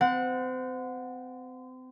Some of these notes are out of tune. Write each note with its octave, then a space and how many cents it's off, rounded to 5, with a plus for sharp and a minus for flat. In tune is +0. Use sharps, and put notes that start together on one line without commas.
C4 -35 F#5 -20